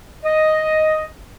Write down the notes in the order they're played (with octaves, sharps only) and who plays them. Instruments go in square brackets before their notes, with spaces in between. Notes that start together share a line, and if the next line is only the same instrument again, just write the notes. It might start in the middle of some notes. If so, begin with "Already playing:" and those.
[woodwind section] D#5